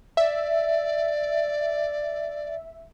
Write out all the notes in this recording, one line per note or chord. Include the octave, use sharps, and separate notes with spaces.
D5 E5